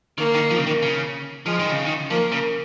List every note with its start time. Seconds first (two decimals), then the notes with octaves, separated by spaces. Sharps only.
0.18 D#3 A#3
0.34 D#3
0.50 F3
0.58 C#3
0.67 D#3
0.82 C#3
1.46 F3 G#3
1.60 D#3
1.73 C#3
1.86 D#3
2.10 F3 A#3
2.32 C#3